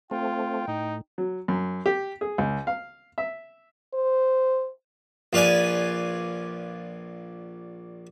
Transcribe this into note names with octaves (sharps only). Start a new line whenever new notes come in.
A3 C4 F4 G5
A2 D#4
F#3
F#2
G4
G#4
C#2
F5
E5
C5
A#1 F4 B4 D5 G#5